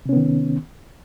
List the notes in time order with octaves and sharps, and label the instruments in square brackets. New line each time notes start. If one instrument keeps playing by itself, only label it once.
[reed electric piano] C3
C#4
B3
D#3